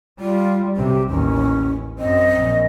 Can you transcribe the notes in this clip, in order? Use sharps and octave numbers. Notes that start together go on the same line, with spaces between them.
G3 F4
B1 C3 G4
A1 D#2 C#4
F#2 C4 D#5
A#1